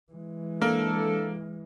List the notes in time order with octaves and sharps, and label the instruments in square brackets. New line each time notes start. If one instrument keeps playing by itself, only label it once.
[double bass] E3 G#3
[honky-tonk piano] A#3 [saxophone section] D4 A4